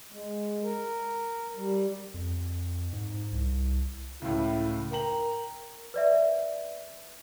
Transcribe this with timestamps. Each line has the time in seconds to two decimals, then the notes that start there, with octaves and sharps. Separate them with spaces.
0.12 G#3
0.64 A#4
1.56 G3
2.14 F2
2.93 G#2
3.32 C2
4.22 C#2 A2 E4
4.92 A#4 G5 A#5 F#7
5.94 B4 D5 E5